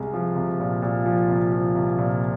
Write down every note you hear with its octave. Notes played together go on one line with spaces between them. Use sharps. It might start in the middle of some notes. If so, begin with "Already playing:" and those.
Already playing: C2 G#3
F3
C2
A#2
A#2
F3
C2
F3
C2
A#2